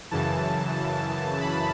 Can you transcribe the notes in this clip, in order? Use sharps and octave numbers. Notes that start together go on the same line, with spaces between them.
F#2 C#3 E3 A5
B5